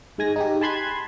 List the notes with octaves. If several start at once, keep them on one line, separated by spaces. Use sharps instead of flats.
G#2 G#3 G#5 A#6
D#4 G4
G#5 A5 B5 C6 F#6 G#6